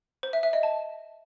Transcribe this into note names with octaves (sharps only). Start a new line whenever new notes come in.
C5
E5
E5
D#5
A5